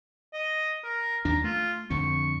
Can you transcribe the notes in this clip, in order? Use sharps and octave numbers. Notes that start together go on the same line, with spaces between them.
D#5
A#4
D#2 D4 A#5
A3 F4
F2 D3 C4 C#6